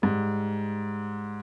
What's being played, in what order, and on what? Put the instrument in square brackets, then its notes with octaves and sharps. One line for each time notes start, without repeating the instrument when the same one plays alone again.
[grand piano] G#2 G3